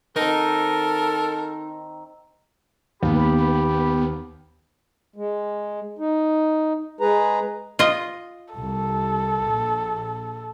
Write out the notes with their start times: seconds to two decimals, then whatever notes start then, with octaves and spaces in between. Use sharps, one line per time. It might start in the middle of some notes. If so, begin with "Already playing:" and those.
0.17 D#3 C4 D#4 A4 A#4
3.03 D#2 B3 G4 B5
5.16 G#3
5.99 D#4
7.01 G#3 G#4 B4 A#5
7.79 F4 D#5
8.54 C2 A4
9.45 A#1